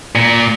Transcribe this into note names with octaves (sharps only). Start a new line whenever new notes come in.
A#2